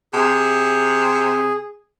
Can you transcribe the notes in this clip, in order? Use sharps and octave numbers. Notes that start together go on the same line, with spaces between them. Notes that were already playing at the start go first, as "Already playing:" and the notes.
C3 G#4